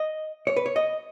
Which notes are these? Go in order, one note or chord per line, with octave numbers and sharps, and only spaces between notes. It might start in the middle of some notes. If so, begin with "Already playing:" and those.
Already playing: D#5
C#5
B4
C#5
D#5